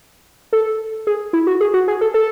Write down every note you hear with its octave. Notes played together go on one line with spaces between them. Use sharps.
A4
G#4
E4
F#4
G#4
F#4
G#4
A4
A4